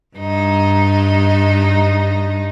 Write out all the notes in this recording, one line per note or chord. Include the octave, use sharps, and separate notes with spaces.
G2 D#4